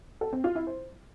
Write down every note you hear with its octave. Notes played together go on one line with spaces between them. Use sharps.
A4
C4
F4
E4
C5